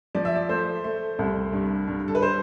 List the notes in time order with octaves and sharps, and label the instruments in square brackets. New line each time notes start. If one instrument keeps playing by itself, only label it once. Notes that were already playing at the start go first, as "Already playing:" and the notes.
[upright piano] F3 D5
E5
D5
A3 C5
A3
C2
G2
G2
A4
B4
C5